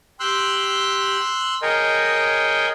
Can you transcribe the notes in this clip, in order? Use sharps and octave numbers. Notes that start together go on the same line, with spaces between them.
G4 C6 E6 F#6
G#4 A#4 C#5 D#5 G5